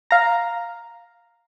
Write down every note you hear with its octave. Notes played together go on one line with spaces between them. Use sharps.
F5 A#5